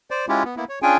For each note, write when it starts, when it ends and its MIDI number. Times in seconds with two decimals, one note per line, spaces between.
0.11 0.26 72
0.11 0.26 74
0.29 0.43 56
0.29 0.43 61
0.29 0.43 64
0.29 0.43 65
0.29 0.43 67
0.45 0.55 59
0.57 0.65 58
0.57 0.65 59
0.57 0.65 64
0.69 0.79 73
0.82 0.97 61
0.82 0.97 62
0.82 0.97 65
0.82 0.97 68
0.82 0.97 79
0.82 0.97 80